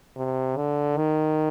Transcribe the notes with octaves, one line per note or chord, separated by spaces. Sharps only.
C3
D3
D#3